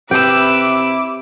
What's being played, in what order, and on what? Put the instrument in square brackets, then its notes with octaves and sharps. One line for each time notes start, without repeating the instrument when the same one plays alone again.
[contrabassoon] C3 [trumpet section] E4 D6 [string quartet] B4 E6 [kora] G5